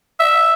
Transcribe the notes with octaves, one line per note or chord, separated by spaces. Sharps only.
E5